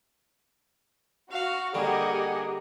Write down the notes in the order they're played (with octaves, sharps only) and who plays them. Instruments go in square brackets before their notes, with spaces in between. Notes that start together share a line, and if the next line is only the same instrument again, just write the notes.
[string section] F#4 [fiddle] F5
[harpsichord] D3 G3 [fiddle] A#3 G#4 [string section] G4 D#5 F#5